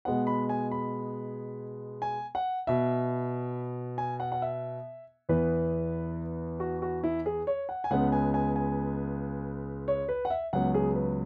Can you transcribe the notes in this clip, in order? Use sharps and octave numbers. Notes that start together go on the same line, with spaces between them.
B2 G#3 B3 F#5
B5
G#5
B5
G#5
F#5
B2 B3 E5
G#5
F#5
F#5
E5
E2 E3 B3 B4
F#4
F#4
E4
G#4
C#5
F#5
G#5
C#2 C#3 G#3 B3 F#5
G#5
G#5
G#5
C#5
B4
F#5
E5
C#2 C#3 F#3 B3 F#5
G#4
B4